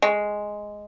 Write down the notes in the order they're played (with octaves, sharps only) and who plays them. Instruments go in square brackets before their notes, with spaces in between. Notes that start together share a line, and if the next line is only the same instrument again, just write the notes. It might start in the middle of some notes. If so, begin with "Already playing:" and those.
[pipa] G#3